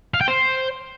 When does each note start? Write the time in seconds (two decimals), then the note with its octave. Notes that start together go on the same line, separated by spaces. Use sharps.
0.14 F5
0.21 G5
0.28 C5